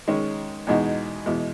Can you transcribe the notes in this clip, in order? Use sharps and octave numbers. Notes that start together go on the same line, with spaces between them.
D#3 G#3 C#4
E2 B2 G#3 D#4 F#4
E2 B2 G#3